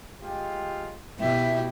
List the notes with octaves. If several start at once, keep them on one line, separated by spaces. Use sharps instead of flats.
G#3 F4 G4
B2 E4 G4 E5